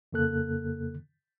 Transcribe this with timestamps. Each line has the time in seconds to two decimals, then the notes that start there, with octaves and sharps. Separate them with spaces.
0.13 F2 C#3 A#3 A4 F#6